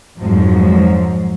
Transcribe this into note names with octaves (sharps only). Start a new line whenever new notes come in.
F2 G#2 F3 F#3